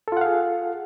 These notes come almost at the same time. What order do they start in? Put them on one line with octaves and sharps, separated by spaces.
A4 F4 F#5 F5 G#4